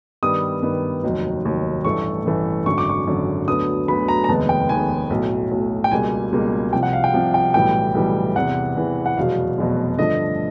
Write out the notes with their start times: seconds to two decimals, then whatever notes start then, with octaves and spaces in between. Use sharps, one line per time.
0.23 G2 D#3 G3 B3 D#6
0.63 G2 D#3 G3 B3
1.04 F1 D#2 D#3 F#3
1.44 F1 D#2 D#3 F#3
1.85 A1 G2 E3 A3 C#6
2.25 A1 G2 E3 A3
2.66 G#1 F#2 D3 C#6
2.78 D6
2.89 C#6
3.07 G#1 F#2 D3
3.48 D2 D3 F#3 B3 D#6
3.88 D2 D3 F#3 B3 B5
4.08 A#5
4.24 A#5
4.29 F1 D#2 D#3 G#3 B3 A5
4.49 G5
4.69 F1 D#2 D#3 G#3 B3 G#5
5.10 B1 A2 F#3
5.51 B1 A2 F#3
5.84 G5
5.91 C#2 B2 G3 A#3 G#5
6.32 C#2 B2 G3 A#3
6.73 C2 C3 F3 G5
6.83 F#5
6.93 F5
7.04 G5
7.14 C2 C3 F3
7.34 G5
7.54 B1 A2 E3 G3 G5
7.94 B1 A2 E3 G3
8.36 E2 C3 E3 F#5
8.76 E2 C3 E3
9.06 F#5
9.17 F1 E2 B2 F#3 F5
9.58 F1 E2 B2 F#3
9.99 G2 D3 F3 A3 D#5